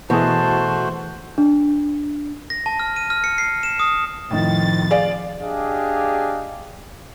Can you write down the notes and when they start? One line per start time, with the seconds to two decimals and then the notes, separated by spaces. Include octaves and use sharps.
0.10 B2 E3 A3 F#4 G#4 C5 A5
1.38 D4
2.50 A#6
2.66 A5
2.80 F6
2.96 D#7
3.10 F6
3.24 C#7
3.38 C7
3.63 E7
3.79 D#6
4.31 F2 A2 D#3 A6
4.91 G#4 D5 F5
5.41 D4 G4 G#4 D#5 F5